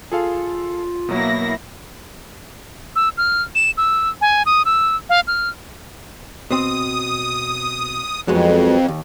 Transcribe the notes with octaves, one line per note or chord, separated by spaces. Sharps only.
F4 G#4 A4 F5
B2 F#3 A#3 E4 A#6
E6
F6
E7
E6
G#5
D#6
E6
F5
F6
B2 C4 D#6
F2 F#3 G#3 B3
D#2